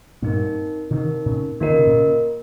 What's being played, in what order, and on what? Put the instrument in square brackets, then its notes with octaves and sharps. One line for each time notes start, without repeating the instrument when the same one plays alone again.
[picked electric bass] G2 A#2 [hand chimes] C4 D#4 A#4
[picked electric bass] C3 D#3 [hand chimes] C4 D#4 A#4
[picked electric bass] A#2 C#3
[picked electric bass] D#3 [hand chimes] A#3 F4 A#4 D#5
[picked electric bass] C#3
C3
A#2 C#3